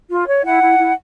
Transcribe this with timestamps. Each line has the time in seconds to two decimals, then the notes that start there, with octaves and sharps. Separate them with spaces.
0.10 F4
0.27 C#5
0.44 E4 F#5
0.62 E4
0.79 E4